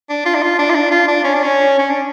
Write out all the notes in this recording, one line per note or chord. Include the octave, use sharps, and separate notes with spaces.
D4
F4
D4
F4
D4
F4
D4
F4
D4
C#4
D4
C#4
C#4
D4